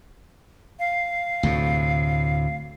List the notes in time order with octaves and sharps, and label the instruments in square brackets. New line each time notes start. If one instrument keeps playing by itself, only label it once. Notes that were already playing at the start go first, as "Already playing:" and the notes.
[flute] F5
[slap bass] D2 A2 C3